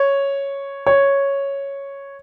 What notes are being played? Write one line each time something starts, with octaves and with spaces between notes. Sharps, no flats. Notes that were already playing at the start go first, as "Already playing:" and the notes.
Already playing: C#5
C#5